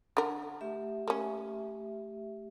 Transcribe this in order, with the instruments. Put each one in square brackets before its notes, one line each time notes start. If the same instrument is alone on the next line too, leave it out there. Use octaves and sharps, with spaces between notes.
[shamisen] D3 A#4 [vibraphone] F#5
[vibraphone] A3 G4 E5
[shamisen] A#3 C#4